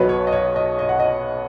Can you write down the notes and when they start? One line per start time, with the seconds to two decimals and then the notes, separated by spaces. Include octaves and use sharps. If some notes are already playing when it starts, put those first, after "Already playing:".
Already playing: B1 B2 F#3 B3 B4
0.09 C#5
0.27 D#5
0.33 C#5
0.56 D#5
0.79 D#5
0.89 F#5
1.00 D#5